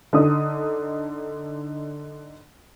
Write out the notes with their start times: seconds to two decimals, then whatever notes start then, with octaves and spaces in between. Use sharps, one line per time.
0.13 D3 D4 D#4 D#6